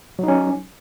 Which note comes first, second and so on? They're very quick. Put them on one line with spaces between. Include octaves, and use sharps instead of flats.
F#3 D#4 C#4